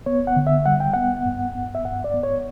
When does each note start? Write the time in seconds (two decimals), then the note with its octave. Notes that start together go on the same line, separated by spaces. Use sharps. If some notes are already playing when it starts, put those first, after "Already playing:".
0.06 B3 C#5
0.27 F#5
0.36 D3
0.47 E5
0.66 G3 F#5
0.80 G5
0.94 B3 F#5
1.26 G2
1.55 B3
1.75 E5
1.85 G2 F#5
2.04 D5
2.14 B3
2.23 C#5